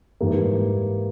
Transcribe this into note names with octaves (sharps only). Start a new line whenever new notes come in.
G#2 E3 G3 A#3